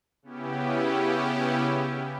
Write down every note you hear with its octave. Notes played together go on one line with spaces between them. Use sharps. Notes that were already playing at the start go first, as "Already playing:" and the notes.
C#3 B3 C#4 E4 G4